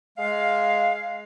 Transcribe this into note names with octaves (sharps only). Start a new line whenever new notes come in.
G#3 F5